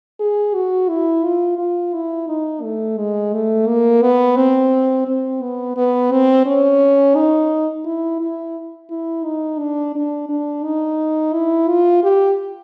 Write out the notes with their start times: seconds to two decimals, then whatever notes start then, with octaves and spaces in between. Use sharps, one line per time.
0.20 G#4
0.55 F#4
0.89 E4
1.24 F4
1.59 F4
1.94 E4
2.28 D#4
2.63 A3
2.97 G#3
3.33 A3
3.67 A#3
4.02 B3
4.37 C4
5.07 C4
5.42 B3
5.77 B3
6.12 C4
6.46 C#4
7.16 D#4
7.85 E4
8.20 E4
8.90 E4
9.25 D#4
9.59 D4
9.95 D4
10.29 D4
10.64 D#4
11.33 E4
11.68 F4
12.04 G4